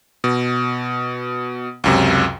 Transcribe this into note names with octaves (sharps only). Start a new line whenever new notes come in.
B2
C#2 F#2 C3